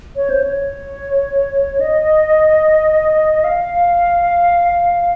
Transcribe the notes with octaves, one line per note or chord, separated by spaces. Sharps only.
C#5
C5
C#5
D#5
F5